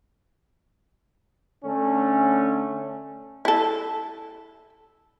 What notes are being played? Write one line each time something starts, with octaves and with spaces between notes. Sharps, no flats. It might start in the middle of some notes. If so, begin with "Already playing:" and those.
D3 A3 C#4
E4 A4